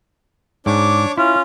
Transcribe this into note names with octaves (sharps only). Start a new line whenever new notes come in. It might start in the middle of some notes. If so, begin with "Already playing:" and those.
G#2 D4 C#5 D6
C#4 E4 F4